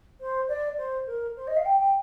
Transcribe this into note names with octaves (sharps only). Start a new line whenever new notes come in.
C5
D5
C5
A#4
C5
D#5
F5
G5
G5